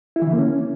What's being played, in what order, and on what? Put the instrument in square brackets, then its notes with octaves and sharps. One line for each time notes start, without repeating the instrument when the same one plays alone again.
[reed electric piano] E4
E3
D3
A#3
C#4